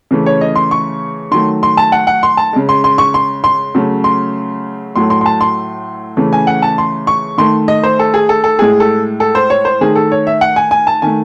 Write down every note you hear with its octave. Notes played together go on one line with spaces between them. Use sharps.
C#3 E3 A3
C#5
D#5
C6
C#6
D#3 F#3 A3 C6
C6
A5
F#5
F#5
C6
A5
C#3 G#3
C6
C6
C#6
C6
C6
C#3 F#3 A3
C6
A2 F#3 A3 C6
C6
C6
A5
C6
C#3 E3 A3
G#5
F#5
A5
C6
C#6
D#3 A3 C6
D#5
C5
A4
G#4
A4
A4
A2 G#3 G#4
A4
A4
C5
C#5
C5
D#3 A3 G#4
A4
C#5
E5
F#5
G#5
G#5
A5
D#3 A3 G#5